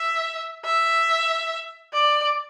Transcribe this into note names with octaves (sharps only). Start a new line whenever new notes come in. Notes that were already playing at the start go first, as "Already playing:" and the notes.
Already playing: E5
E5
D5